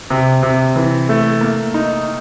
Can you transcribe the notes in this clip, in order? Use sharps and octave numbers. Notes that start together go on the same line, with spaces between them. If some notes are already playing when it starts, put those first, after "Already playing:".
C3
C3
E3
A3
A#3
D#4